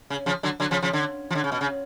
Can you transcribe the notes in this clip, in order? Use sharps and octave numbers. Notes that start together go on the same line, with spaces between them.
C#3
C#3 F3
D3 F#3
D3 F#3
C#3 F3
C#3 F3
D3
F3
D3
C#3
B2
C#3